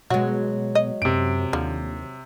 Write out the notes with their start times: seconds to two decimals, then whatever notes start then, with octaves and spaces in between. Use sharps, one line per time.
0.10 B2 F#3 G#3 F#4
0.75 D#5
1.02 F#2 C3 D7
1.53 D#2 D3 F3